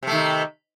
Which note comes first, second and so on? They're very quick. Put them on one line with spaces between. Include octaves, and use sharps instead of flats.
C3 A3 D#3